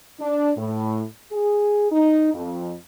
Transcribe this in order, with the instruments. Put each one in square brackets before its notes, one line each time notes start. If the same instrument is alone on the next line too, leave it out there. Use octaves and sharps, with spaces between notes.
[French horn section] D4
A2
G#4
D#4
F2